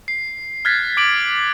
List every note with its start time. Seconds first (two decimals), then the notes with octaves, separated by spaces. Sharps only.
0.08 C7
0.65 F6 F#6 G#6 A6 B6
0.97 D6 D7 F#7